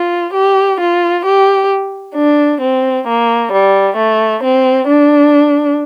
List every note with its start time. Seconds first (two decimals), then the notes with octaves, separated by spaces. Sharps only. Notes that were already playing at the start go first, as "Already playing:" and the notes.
Already playing: F4
0.34 G4
0.79 F4
1.25 G4
2.15 D4
2.61 C4
3.07 A#3
3.52 G3
3.97 A3
4.43 C4
4.89 D4